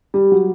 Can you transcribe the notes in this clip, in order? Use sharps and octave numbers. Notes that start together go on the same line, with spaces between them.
G3
F#3